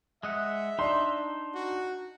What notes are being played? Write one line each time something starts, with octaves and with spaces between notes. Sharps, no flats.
G#3 D#5 E5 F#5
D4 D#4 D5 C6
F#4